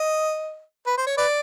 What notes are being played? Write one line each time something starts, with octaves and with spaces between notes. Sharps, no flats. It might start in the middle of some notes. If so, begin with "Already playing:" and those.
Already playing: D#5
B4
C5
C#5
B4 D5